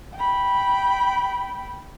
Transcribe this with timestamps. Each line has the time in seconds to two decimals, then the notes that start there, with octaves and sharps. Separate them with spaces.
0.15 G5 B5